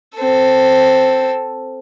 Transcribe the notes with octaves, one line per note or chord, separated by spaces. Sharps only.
C4 A4